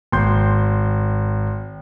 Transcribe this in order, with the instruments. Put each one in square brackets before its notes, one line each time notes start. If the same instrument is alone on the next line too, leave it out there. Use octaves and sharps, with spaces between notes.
[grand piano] G#1 C6 G6